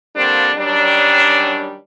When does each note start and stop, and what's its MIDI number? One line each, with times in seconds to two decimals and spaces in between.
0.16 0.51 50
0.16 0.51 53
0.16 0.51 55
0.16 0.51 58
0.16 0.51 60
0.16 0.51 62
0.56 1.77 51
0.56 1.77 54
0.56 1.77 55
0.56 1.77 61
0.56 1.77 62